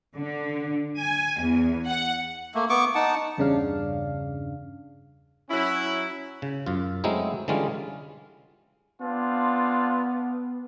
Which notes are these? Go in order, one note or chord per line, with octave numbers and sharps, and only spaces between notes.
D3
G#5
E2
F#5
A3 A#3
B3 C#6 D6
D#4 F#5 A5
E2 G2 C#3 D4 F5
F#3 C#4 E4
C#3
F#2 F4
F#3 G#3 A3 C4 D#4 E4
D3 E3 G3 G#3 C#4 F4
B3 C4 D4 F4